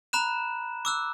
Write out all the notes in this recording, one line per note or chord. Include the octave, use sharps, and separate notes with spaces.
A#5 B5 F#6 E7
D6 E6 F#6